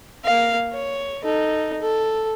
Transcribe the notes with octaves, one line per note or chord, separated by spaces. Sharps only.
A#3 F5
C#5
D#4 A4
A4